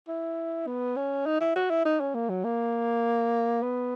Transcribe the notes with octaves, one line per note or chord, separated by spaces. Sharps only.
E4
B3
C#4
D#4
E4
F#4
E4
D#4
C#4
A#3
F#3
A#3
B3